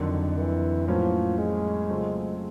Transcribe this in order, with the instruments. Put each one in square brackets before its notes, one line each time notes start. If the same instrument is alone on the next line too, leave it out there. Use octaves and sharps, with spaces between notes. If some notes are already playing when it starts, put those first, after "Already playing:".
Already playing: [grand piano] F2 D3 F#3 [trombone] D#3
[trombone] E3
[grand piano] A2 F#3 A#3 C#4 [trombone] F3
[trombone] G#3
[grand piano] C#3 F#3 A3 C4 F4